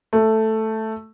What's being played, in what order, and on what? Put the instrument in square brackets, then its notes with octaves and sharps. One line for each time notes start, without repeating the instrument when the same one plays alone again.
[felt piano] A3